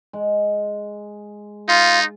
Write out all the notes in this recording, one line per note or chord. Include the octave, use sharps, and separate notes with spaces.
G#3
D#4 F4 F5